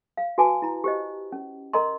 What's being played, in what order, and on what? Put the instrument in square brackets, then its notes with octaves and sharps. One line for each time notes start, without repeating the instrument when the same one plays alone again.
[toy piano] F5
F#4 B4 G#5 A5 D6
E4 A#5
G4 C5 D#5
C#4
A#4 D#5 A#5 C6